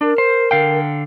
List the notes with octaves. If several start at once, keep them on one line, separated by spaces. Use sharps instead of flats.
D4 A#4
C5
D3 F5 G5